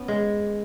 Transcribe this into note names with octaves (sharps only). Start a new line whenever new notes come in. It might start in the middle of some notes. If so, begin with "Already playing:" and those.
Already playing: B3 C#4
G#3